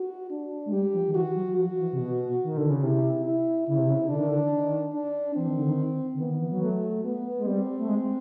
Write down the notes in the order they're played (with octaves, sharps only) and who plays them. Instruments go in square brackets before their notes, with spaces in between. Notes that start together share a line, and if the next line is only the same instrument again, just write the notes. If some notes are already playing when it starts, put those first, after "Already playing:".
Already playing: [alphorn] F#4
D4
[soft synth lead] G#3
[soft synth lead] G3 [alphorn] G4
[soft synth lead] F3
D#3
[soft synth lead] E3 [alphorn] F#4
[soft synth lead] F#3
[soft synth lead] F3 [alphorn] F#4
[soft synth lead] E3
C3
B2
D#3
D3
C#3
[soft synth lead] C3 [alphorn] E4
[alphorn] E4
[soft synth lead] C#3 [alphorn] E4
[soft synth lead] C3
C#3
[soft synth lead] D3 [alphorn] D4
[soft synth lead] D#3
D3
D#3
[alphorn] D4
[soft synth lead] E3 [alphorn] C4
[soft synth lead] D#3
D3
D#3
D3
[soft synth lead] D#3 [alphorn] B3
[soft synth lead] D#3
E3
F#3
[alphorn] A3
B3
[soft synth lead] G#3
[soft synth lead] G3 [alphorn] C4
[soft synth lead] A3
G#3